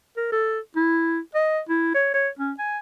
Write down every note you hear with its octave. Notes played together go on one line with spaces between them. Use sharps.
A#4
A4
E4
D#5
E4
C#5
C#5
C#4
G#5